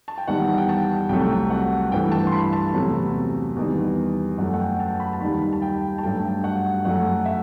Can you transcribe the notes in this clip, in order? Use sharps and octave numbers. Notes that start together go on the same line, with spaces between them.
A5
G5
E2 D#3 G3 F#5
G5
A5
C2 C3 F#3 A3 G5
F#5
G2 E3 A3 G5
A5
C6
B5
A5
E2 C3 F#3 A3
E2 D#3 G3
F#2 F#3 A3 F#5
F#5
G5
A5
B5
A5
D#2 D#3 G3 B5
A5
G5
A5
G2 F#3 A3 G5
F#5
F#2 F#3 A3 F#5
E5